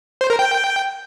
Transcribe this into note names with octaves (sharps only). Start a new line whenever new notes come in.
C5
A#4
G5